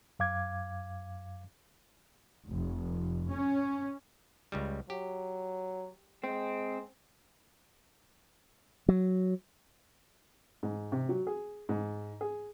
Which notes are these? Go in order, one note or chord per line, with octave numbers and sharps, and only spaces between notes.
F#2 F5 D6 G#6
F1
C#4
C#2 C#3 G3
F#3 G4
G#3 C4
F#3
G#2
C3
F#3
G#4
G#2
G#4